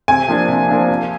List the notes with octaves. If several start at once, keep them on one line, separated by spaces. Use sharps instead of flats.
C3 G#5
F3 A#3 D4
C3
F3 A#3 D4
C3